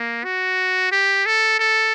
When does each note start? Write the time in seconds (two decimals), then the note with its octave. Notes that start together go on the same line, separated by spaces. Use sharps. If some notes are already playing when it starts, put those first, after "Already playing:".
Already playing: A#3
0.24 F#4
0.92 G4
1.26 A4
1.59 A4